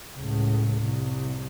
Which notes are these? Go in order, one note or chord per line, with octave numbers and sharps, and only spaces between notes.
C#2 A2
C2